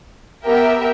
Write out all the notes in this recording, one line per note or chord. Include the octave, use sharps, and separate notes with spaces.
B3 G4 A#4 E5 G5